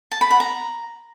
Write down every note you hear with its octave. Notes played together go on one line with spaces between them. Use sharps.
A5
B5
F#5
A#5